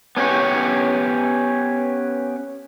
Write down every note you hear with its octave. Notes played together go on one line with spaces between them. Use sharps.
B3 C#4 F4 G4 C#5